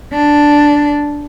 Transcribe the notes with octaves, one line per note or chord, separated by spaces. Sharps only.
D4